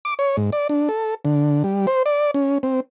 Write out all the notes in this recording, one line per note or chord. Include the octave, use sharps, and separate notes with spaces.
D6
C#5
G#2
D5
D4
A4
D3
G3
C5
D5
C#4
C4